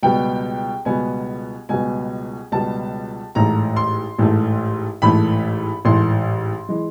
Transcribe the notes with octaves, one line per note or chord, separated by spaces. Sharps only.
C#2 B2 G3 B3 G5
C#2 B2 G3 B3 G#5
C#2 B2 G3 B3 G#5
C#2 B2 G3 B3 A5
A1 G#2 E3 A3 A#5
C6
A1 G#2 E3 A3
A1 G#2 E3 A3 B5
A1 G#2 E3 A3 C6
E3 G#3